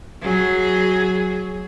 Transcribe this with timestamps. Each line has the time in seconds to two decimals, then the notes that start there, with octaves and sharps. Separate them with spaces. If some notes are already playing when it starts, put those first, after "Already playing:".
0.22 F#3 G#4